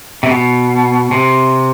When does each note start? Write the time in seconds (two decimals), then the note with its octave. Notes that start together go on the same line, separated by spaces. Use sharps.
0.23 C3
0.30 B2
1.11 C3